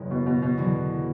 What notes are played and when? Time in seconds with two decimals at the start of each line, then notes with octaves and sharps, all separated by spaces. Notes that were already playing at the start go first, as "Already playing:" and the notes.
Already playing: F#1 E2 C#3 G#3
0.11 B2
0.26 B2
0.42 B2
0.57 E2 D3 F#3